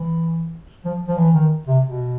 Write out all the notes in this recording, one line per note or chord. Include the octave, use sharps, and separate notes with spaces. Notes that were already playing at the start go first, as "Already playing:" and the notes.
Already playing: E3
F3
F3
E3
D#3
C3
B2